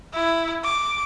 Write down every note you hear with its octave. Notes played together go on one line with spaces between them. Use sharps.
E4
D6